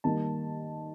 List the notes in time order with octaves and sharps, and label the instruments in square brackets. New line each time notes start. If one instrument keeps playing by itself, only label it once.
[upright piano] D#3 G3 A#3 A5